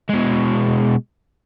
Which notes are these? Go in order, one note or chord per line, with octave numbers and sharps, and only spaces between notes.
B2 G#3